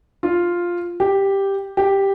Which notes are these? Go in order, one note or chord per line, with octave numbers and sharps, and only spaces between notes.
F4
G4
G4